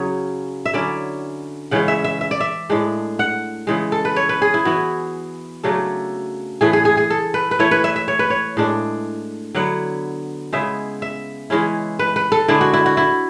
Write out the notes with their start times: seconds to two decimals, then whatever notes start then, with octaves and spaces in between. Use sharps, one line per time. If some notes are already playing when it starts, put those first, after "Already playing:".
Already playing: C#3 F#3 C#4 E4 C#5
0.66 E5
0.73 D3 F#3 C#4 E4 D5
1.71 C#3 E3 G#3 C#4 F#5
1.88 E5
2.04 E5
2.21 E5
2.31 D5
2.40 E5
2.70 A2 G#3 D4
3.19 F#5
3.67 C#3 E3 G#3
3.92 A4
4.05 B4
4.16 C#5
4.29 B4
4.42 G#4
4.54 E4
4.65 E3 B3 E4 F#4
5.63 C#3 F#3 A3 D4 A4
6.61 A2 E3 A3 G#4
6.73 G#4
6.85 G#4
6.97 G#4
7.10 A4
7.34 B4
7.51 B4
7.59 E3 A3 E4 C#5
7.71 B4
7.84 E5
7.96 E5
8.08 C#5
8.19 B4
8.30 C#5
8.57 A2 G#3 D4
9.55 D3 F#3 B3 E4 F#5
10.53 C#3 G#3 B3 E4 E5
11.02 E5
11.50 E3 G#3 C#4 E4
11.99 B4
12.16 B4
12.32 A4
12.48 D3 G#3 D4 E4
12.61 F#4
12.73 E4
12.86 F#4
12.97 E4